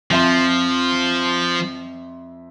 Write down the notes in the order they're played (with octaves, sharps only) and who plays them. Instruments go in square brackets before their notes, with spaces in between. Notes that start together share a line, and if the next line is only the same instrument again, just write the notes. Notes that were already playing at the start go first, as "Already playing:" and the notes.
[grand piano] F2 E5 C6 [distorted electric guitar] F3